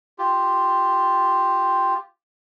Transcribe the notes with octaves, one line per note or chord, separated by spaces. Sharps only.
F4 G4